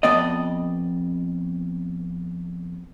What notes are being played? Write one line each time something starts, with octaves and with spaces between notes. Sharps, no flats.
F2 B3 D5 D#5